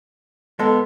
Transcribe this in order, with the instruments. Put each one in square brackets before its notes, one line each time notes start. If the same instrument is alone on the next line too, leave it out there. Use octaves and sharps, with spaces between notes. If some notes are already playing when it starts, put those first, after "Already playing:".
[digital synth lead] G#3 [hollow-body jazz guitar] B3 A4